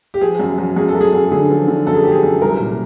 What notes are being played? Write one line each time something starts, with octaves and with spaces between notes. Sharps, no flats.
G4
F3 G#4
F#2
F#2
F#2 G#4
A4
F#2
G#4
F#2
D3 G#4
F3
D3
F#2 A4
G#4
F3 G4
G#4
F#2
C2 A#4
A#2